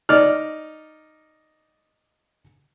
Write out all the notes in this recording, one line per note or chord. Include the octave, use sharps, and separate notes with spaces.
D#4 D5 F6